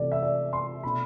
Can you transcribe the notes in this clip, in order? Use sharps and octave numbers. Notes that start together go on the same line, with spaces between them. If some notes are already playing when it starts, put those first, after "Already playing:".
Already playing: C3 E3 A3 D5
E5
D5
C6
B2 A3 D4 B5